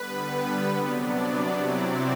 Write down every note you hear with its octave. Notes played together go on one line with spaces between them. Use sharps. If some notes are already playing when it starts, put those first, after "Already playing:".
Already playing: D3 G3 B3 B4
C3 F#3 B3 D4 D5
C3 F#3 C4 E4